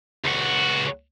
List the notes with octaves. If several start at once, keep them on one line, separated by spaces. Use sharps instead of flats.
C#2 F#4